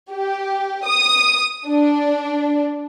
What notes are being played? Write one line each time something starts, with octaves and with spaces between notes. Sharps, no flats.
G4
D#6
D4